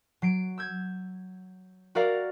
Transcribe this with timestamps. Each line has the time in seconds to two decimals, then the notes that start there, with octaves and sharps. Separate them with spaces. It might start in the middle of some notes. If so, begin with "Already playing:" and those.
0.22 F#3 C7 D7
0.58 E6 G6 G#6
1.95 F#4 A#4 D5 F5